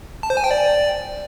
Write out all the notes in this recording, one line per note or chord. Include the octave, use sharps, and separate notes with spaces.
A5
C5
G#5
G5
D5